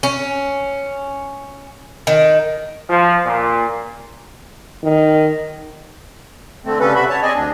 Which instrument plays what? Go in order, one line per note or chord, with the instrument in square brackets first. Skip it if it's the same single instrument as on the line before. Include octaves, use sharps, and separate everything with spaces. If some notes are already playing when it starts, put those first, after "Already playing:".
[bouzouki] C#4
D#3
[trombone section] F3
A#2
[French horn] D#3
[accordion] D3 A3 C4
C#3 G3 C#4 A4 B4
C3 G3 F#4 E5 B5
C#5 A5
C4 G#4 D5 D#5 G#5
D2 D4